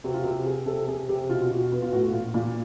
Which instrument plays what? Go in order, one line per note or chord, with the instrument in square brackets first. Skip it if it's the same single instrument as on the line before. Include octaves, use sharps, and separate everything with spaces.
[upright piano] C3 F#4
F4
C3 F#4
C3 G#4
C3 A4
C3 G#4
C3 G4
B2 F4
F4
B2 F#4
B3 F#4
F4
A2 F#4
F4
A#2 F4
A#2